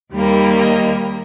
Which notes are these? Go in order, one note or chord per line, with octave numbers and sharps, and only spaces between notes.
D#2 D#3 G3 A#3
D#5